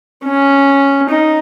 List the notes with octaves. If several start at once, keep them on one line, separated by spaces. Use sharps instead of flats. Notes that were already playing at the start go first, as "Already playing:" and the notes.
C#4
D#4